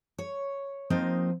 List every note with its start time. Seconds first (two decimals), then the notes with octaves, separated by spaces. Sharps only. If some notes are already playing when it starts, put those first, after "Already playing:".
0.18 C#5
0.90 F3 A#3 C4 D#4 D#5